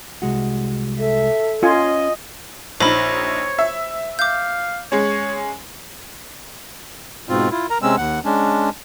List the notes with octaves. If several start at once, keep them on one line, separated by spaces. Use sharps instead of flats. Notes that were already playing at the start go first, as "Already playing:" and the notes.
C2 G#3 F#4
A4 E5
C#4 F4 D#5 G#5
A#1 D#4 C5 C#5 B5
E5
F5 D6 G6
G#3 C#4 C#5
G#2 B2 C4 F4
E4 F4
A#4 A#5
C3 G#3 C4 C#4 E6
D#2 F#5
G#3 C#4 D4